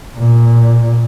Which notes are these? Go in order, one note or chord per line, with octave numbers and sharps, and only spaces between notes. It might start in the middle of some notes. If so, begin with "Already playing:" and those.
A#2